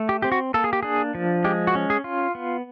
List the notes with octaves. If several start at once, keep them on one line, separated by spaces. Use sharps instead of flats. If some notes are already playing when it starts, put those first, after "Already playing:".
Already playing: A3
G4
C4 G4
F#4
A#3 A4
G#4
G4
D4 G#4
F3
G#3 G4
F#4
C#4
G#4
F4
B3